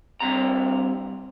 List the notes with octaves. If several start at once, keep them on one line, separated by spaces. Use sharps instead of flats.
G2 C3 A#5